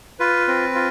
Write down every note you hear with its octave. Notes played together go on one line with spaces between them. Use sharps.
F4 B4
C4
F4